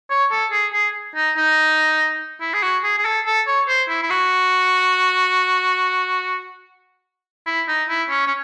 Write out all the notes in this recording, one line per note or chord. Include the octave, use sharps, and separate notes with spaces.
C#5
A4
G#4
G#4
D#4
D#4
E4
G#4
F#4
G#4
G#4
A4
A4
C#5
C5
E4
E4
F#4
E4
D#4
E4
C#4
C#4